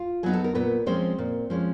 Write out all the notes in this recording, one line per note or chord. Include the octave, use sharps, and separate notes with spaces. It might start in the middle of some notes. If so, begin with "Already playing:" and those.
Already playing: F4
F#3 B3 D#4 G#4
A4
A#4
A#2 B3 B4
F3 G#3 C4 C#4 C5
A#2
F3 G#3 C#4